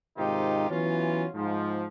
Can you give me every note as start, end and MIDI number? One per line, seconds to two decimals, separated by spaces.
0.18 0.68 44
0.18 0.68 48
0.18 0.68 51
0.18 0.68 63
0.18 0.68 65
0.18 0.68 67
0.70 1.26 52
0.70 1.26 54
0.70 1.26 59
0.70 1.26 61
0.70 1.26 65
1.34 1.85 44
1.34 1.85 53